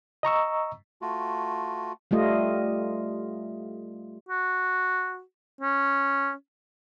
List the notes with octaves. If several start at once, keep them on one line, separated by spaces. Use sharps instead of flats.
D#5 A#5 C#6 E6
A3 F4 F#4
G3 A3 F4 D#5
F#4
C#4